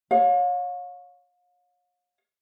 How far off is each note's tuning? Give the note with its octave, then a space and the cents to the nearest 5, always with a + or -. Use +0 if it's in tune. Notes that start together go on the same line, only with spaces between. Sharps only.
C#5 +0 F5 +40